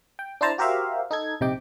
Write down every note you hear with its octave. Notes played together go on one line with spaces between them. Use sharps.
G5
D4 E4 C5 A5 A#5
F#4 G4 A#4 C5 E5 F5
D#4 A4 G#6
A#1 C3 D#4 G5 D6